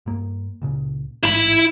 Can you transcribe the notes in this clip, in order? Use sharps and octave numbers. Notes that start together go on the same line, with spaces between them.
G2 A#3
C#2 A#2 C#3
A1 G#2 E3 E4 B5